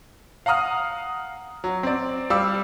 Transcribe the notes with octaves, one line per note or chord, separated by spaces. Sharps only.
F5 F#5 A#5 D#6 F6
F#3
C4 D5
G3 F5 D6 E6